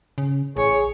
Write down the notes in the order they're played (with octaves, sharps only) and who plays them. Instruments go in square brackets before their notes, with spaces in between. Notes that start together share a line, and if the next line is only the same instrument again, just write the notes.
[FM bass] C#3
[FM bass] A1 [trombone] G#4 [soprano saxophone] C#5